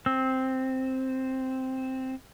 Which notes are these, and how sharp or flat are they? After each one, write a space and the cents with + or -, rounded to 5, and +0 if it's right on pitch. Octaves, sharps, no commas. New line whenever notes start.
C4 +0 E6 -20